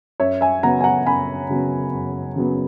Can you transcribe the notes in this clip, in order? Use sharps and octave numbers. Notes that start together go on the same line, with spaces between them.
F#2 C#5 E5
E5 G#5
C#3 F#3 B3 F#5 A#5
G#5
F#5 A#5
F#2 G#5 B5
C#3 F#3 B3
F#2
C#3 F#3 B3